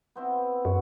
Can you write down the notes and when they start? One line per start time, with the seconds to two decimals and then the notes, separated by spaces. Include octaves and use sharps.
0.16 B3 C4 E4
0.65 F#2 F#4